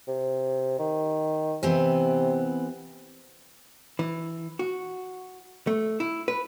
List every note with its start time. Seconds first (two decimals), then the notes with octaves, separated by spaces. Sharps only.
0.08 C3
0.79 D#3
1.63 C3 E3 B3 C4
3.99 E3
4.59 F#4
5.67 A3
6.00 E4
6.28 B4